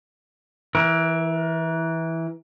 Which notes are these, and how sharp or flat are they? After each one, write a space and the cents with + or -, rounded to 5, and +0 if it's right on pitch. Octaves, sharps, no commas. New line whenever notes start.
E3 -10 A#4 +30